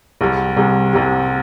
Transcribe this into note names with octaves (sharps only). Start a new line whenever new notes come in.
C2 C3 G3
C2 C3 G3
C2 C3 G3